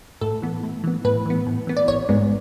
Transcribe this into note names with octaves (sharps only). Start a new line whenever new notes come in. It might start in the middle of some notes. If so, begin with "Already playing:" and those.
A2 A4
E3 B3
A2
E3 B3
A2 B4
E3 B3
A2
E3 B3
D5
A1 C#5
G#2 G#3 B3